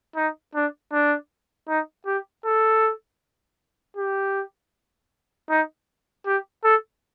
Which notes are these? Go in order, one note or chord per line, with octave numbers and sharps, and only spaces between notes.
D#4
D4
D4
D#4
G4
A4
G4
D#4
G4
A4